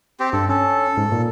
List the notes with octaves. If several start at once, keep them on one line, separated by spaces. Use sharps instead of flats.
C4 G4
G2 A4
C#4 A4
G#2
A#2